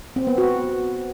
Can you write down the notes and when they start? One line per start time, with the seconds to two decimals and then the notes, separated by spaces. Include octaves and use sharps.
0.16 C4
0.27 B3
0.38 F#4